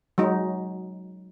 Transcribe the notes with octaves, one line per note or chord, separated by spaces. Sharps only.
F#3 G#3 D#4